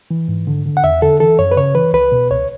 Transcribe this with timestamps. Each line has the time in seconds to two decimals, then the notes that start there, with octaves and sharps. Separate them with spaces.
0.11 E3
0.28 G#2
0.47 D3
0.66 D3
0.77 F#5
0.84 E2 E5
1.02 D3 A4
1.20 E3 A4
1.39 F#2 C#5
1.52 B4
1.57 C#3 C#5
1.75 E3 B4
1.93 C#2 B4
2.12 B2
2.30 C#2 C#5